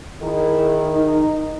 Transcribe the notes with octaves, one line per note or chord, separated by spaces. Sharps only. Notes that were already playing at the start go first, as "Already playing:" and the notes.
D#3 E4 G#4
D#4